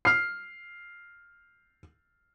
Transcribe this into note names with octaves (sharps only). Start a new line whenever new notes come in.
F6 C7